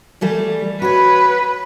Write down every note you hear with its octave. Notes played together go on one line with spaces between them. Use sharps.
E3 G3 A3
F#4 B4 C#5